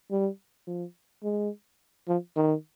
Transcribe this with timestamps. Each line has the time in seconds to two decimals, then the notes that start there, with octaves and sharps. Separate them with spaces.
0.11 G3
0.67 F3
1.24 G#3
2.08 F3
2.36 D#3